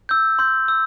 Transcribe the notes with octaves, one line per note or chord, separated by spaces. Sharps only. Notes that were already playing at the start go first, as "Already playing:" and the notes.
E6 G6
C6 G6
E6